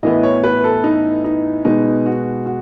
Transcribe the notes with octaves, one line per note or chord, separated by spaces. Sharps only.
A2 E3 B3 D#5
C#5
B4
A4
D#4
D#4
B2 G#3 B3 D#4
F#4
F#4